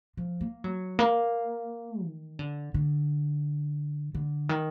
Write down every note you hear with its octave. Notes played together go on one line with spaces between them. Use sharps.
F3
A#3
F#3
A#3
D#3
D3
D3
D3
D#3